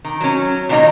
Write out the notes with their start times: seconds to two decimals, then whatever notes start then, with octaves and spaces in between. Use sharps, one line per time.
0.05 D#3
0.21 F#3 C#4
0.69 A#2 D#3 D4 D#4 D#5 A#5